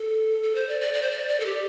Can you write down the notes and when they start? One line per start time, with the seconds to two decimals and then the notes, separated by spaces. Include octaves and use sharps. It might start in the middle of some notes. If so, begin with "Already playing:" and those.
Already playing: A4
0.43 A4
0.55 C5
0.69 D5
0.81 D5
0.94 D5
1.02 C5
1.11 D5
1.28 D5
1.40 A4
1.45 G4